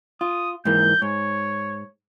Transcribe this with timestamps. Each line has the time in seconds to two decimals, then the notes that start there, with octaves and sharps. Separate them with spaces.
0.21 F4 D#6
0.65 G#2 E3 A#3 G6
1.02 G#2 C#5